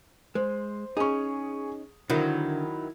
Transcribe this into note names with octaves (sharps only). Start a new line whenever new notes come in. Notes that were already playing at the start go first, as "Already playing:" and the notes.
G#3 C5
C#4 D#4 G#4 C#6
D3 D#3 F#3 E4